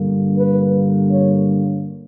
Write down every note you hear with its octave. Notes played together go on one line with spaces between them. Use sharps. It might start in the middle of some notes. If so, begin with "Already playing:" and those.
Already playing: G2 D3 G3 A#3
B4
C#5